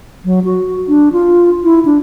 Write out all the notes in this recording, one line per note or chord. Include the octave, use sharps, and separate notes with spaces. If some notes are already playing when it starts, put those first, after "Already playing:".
F#3
F#4
D4
F4
E4
D4